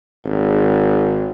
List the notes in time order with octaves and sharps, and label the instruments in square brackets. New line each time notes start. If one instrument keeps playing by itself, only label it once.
[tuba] G#1